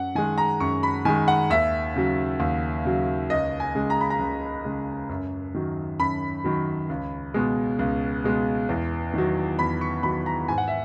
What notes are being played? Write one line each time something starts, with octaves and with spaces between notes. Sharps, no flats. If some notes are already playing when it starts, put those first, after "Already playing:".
Already playing: F#2 F#5
D#3 G#3 G#5
A#5
F#2 C#6
B5
D#3 G#3 G#5
F#5
D#2 E5
C#3 F#3
D#2
C#3 F#3
C#2 D#5
G#5
C#3 G#3
A#5
B5
A#5
C#2
C#3 G#3
F#2
D#3 F#3
F#2 B5
D#3 F#3
C#2
B2 G#3
C#2
B2 G#3
E2
D#3 F#3
E2 B5
C#6
D#3 F#3 B5
A#5
G#2 G#5
F#5
E5